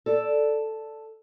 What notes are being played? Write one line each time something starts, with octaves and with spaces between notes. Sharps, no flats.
A4 D5